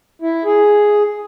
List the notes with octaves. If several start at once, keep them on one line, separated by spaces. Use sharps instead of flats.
E4
G#4